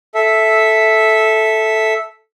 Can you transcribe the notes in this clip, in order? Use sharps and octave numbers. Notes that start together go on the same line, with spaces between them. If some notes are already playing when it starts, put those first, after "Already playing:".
A4 E5